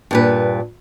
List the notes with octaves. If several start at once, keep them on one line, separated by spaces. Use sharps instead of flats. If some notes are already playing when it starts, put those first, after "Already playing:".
G2 A#2 B4